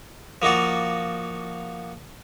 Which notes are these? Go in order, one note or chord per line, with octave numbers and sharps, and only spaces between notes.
F3 A#3 D#4 F#4 D5